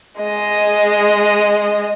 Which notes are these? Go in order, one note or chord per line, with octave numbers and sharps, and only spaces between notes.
G#3 D#5